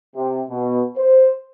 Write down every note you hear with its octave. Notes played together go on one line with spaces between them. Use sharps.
C3
B2
C5